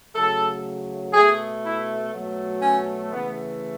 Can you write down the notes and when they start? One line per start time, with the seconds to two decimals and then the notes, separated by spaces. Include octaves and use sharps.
0.14 C#3 F#3 A3 A4
1.13 B2 A3 G#4
1.63 E4
2.13 B2 F#3 A3
2.62 C#4
3.12 C#3 E3 A3 B3